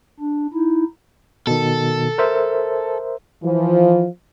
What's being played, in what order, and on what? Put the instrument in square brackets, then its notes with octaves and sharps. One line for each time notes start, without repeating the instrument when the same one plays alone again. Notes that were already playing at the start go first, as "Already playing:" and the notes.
[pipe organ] D4
D#4 E4
[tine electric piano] B2 D#3 [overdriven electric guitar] A4
[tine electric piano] A#4 C5 E5
[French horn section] E3 F3